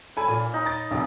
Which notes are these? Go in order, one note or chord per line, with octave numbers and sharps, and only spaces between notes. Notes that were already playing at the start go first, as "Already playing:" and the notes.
A4 G#5 B5
A#2
D#4
A6
F1 C#2